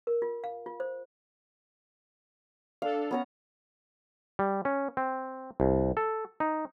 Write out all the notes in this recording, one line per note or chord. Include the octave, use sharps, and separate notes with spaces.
A#4
F4
F5
F4
C5
D4 A4 F5
B3 C#4 A#5
G3
C#4
C4
C2
A4
D#4